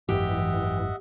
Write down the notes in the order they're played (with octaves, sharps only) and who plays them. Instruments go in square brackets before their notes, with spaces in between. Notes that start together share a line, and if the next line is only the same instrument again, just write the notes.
[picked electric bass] G#1 F#2 [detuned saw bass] E3 [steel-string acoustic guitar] G4 [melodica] D#5 E5 F#5